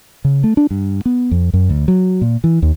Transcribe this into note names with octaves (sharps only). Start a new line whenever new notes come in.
C#3
A3
D4
G2
B3
F2
F#2
D2
F#3
A#2
E3
D#2